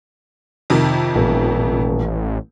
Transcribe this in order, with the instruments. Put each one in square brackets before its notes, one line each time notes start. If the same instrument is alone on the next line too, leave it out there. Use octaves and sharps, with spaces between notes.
[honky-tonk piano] F2 C3 D#3
[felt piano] D#1 [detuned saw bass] A1